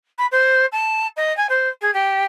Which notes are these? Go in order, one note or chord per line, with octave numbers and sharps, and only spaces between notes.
B5
C5
A5
D#5
G#5
C5
G#4
G4